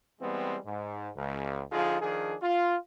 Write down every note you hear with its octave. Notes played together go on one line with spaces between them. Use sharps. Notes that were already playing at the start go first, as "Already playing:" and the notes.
E3 G3 G#3 B3 C4
G#2
C#2
D3 F3 D#4 F4 G#4
D#3 F3 D4 G#4
F4